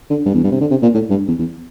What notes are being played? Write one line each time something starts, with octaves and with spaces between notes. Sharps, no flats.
D3
G2
E2
G2
C3
D3
C3
A#2
A2
G2
E2
E2